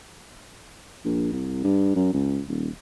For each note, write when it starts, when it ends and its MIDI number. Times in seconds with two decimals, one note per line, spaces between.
1.05 1.31 34
1.32 1.63 36
1.64 1.93 43
1.96 2.13 42
2.13 2.41 37
2.49 2.69 27